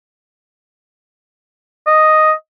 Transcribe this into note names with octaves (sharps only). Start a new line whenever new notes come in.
D#5